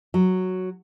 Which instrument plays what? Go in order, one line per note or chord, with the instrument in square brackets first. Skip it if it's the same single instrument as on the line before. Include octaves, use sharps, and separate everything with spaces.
[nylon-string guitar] F#3